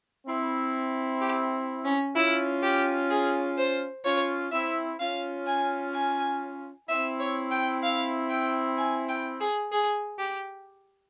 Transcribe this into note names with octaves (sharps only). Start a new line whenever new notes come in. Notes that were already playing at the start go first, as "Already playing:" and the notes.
C4 E4
G4
C#4
C#4 E4 F4
G4
G#4
C5
C#4 F4 C#5
C4 E4 E5
C#4 F4 F5
G#5
G#5
C4 E4 E5
C#5
G5
F5
G5
G#5
G5
G#4
G#4
G4